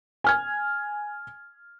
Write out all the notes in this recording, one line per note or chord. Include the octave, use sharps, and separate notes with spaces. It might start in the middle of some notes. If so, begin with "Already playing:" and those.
G#5 F6 G#6